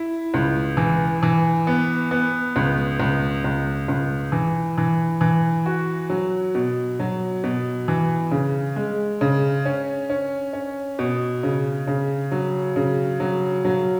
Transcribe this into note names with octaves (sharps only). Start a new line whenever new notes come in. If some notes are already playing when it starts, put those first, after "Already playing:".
Already playing: E4
C#2
E3
E3
B3
B3
C#2
C#2
C#2
C#2
E3
E3
E3
F#4
F#3
B2
F#3
B2
E3
C#3
G#3
C#3
C#4
C#4
C#4
B2
C#3
C#3
F#3
C#3
F#3
F#3